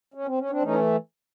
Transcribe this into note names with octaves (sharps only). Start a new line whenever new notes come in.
C#4
C4
C#4
C4 D4
E3 A3 C#4 D#4